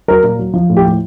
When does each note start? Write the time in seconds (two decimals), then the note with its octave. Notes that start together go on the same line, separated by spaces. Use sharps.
0.08 F#3 A#4
0.23 A#2
0.39 F#3
0.54 F3
0.69 A2
0.77 G4
0.85 A2